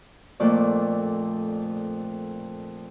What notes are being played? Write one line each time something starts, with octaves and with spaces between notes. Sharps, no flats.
F2 A#2 A3 D5